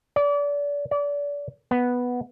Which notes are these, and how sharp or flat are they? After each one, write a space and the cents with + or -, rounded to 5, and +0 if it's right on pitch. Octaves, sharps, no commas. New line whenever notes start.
D5 -30
D5 -30
B3 -5